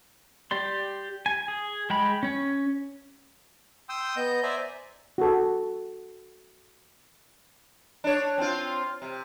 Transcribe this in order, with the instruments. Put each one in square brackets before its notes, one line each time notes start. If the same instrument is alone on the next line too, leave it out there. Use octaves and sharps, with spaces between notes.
[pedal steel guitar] G4 D5 C6
G#5
G#4
G#3 G5 B5
C#4 C#5
[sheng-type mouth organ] G5 C6 D#6 E6
B3 D#5 G6
C5 D5 E5 G#5 A#5
[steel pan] F#4 A4
[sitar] D4 C#5
C4 F4
C3